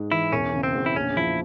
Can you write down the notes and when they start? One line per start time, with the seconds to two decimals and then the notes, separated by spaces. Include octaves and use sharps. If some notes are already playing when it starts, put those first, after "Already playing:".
Already playing: G#2 G#3
0.11 E3 E4
0.32 E1 C#4
0.53 C#3
0.63 C4
0.75 E2
0.86 E4
0.96 A#1 C#4
1.17 F3 E4